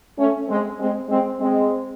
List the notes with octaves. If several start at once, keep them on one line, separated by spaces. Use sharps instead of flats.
A3 C#4
G#3 C4
G#3 C4
G#3 C4
G#3 C4